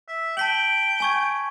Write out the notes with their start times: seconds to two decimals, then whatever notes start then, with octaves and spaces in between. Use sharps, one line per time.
0.08 E5
0.37 G5 A5 B6 F#7
1.00 G#5 C#6 G#6